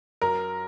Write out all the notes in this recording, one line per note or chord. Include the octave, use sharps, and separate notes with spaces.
F#2 A#4